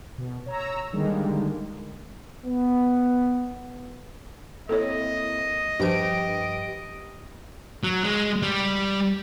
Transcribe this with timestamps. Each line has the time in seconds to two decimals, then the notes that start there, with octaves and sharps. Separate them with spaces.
0.18 B2
0.46 C#5 A#5 E6
0.93 D3 D#3 G3 G#3 A#3
2.45 B3
4.69 A#3 C4 E4 A4 C#5 D#5
5.80 G2 F3 D4 G4 B4 C5 D7
7.83 F#3
8.04 G#3
8.42 G3